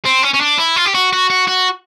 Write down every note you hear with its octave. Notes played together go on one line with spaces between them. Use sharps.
C4
C#4
C#4
D4
E4
F4
G4
F#4
F#4
F#4
F#4